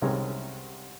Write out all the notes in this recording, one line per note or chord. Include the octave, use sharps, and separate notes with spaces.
C2 C3 D#3 G#3 C#4